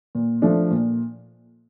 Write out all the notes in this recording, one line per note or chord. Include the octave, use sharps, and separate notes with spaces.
A#2
F3 A3 D4
A#2